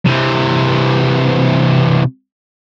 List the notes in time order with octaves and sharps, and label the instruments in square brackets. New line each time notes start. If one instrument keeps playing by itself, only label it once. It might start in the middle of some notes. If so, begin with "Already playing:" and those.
[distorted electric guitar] C3 E3